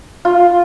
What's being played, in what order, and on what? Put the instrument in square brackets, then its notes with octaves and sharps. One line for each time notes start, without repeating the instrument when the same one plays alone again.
[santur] F4